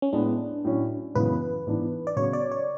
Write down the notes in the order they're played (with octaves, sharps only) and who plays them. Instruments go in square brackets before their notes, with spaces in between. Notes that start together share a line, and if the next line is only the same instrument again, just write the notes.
[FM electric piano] C#4
[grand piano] A2 G#3 B3 [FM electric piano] D4
[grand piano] A2 F#3 C#4
[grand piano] F#2 C#3 E3 G#3 B3 [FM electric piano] B4
[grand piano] G#2 E3 B3 D4
[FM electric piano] D5
[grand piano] C#3 F#3 B3 [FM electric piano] C#5
[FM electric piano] D5
C#5